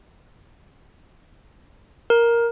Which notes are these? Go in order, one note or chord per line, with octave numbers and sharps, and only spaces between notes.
A#4